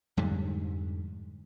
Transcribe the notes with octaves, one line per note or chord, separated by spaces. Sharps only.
F2 G#2 D3 G3